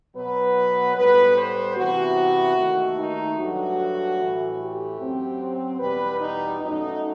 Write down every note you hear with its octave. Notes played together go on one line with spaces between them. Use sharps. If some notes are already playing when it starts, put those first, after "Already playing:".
B2 F#3 B3 B4
A2 G3 B3 B4
C5
C3 E3 B3 F#4
D#2 D#3 A3
D#4
G2 F#3 A3 F#4
A2 E3 A3
G4
F#2 F#3 C4
E2 B2 G3 B4
D#4
F#2 F#3 A3 D#4